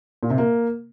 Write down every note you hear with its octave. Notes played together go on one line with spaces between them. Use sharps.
A#2
C3
A#3